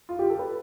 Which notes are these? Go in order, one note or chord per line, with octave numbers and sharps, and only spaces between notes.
F4
G4
A4
B4